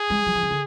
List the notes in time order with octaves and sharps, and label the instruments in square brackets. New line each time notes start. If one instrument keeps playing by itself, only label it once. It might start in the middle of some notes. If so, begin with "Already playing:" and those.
Already playing: [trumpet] G#4
[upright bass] G#3
F#3
F3
D#3
D3